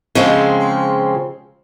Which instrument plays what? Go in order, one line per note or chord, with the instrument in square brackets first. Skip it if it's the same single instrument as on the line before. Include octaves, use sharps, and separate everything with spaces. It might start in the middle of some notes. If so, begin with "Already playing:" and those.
[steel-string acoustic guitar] C#3 F3 G#3 C4